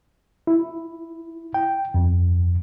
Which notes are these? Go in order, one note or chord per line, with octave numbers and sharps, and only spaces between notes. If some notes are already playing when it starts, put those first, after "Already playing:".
E4
G5
F2